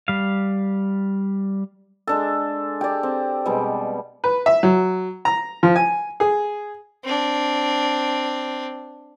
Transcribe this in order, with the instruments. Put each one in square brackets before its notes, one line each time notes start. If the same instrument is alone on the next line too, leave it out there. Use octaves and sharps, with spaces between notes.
[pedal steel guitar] G3 F5
[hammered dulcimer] G#3 D4 A4
G4 D5
C4
B2 G3 G#3
[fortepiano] B4
E5
F#3
A#5
F3
G#5
G#4
[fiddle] C4 D4